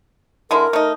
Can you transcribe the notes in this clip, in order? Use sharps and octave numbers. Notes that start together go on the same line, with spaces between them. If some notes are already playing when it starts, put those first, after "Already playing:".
D3 G#3 E4 A#4
A3 D#4